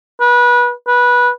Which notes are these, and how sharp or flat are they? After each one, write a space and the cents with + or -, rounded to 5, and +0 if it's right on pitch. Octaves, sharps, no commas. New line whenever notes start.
B4 -25
B4 -15